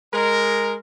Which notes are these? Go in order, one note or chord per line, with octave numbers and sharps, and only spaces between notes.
G#3 A#4